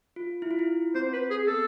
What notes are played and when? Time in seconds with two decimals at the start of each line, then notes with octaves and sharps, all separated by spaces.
0.16 F4
0.42 E4
0.51 F4
0.59 E4
0.95 C4 C5
1.13 B4
1.30 G#4
1.47 B3 A4